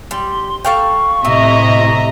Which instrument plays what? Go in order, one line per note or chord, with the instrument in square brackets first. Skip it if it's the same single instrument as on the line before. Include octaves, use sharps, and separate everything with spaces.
[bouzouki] G3 [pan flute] C6
[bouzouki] A4 F5 G5 [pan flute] C#6
[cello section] A2 C3 [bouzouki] E4 [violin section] D#5 E5 A#5